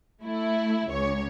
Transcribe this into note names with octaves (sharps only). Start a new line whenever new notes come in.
A3 E4
C#2 C#5